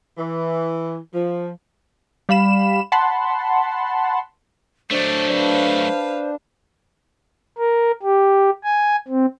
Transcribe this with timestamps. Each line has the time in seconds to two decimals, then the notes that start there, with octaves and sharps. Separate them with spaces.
0.18 E3
1.15 F3
2.29 G3 F5 B5 E7
2.92 F#5 A5 B5 C6
4.91 F#3 A3 D4 C5 D5
5.33 B4 F5
7.58 A#4
8.03 G4
8.64 G#5
9.08 C4